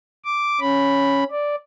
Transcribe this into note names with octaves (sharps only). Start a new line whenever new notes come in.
D6
C#4 B5
D5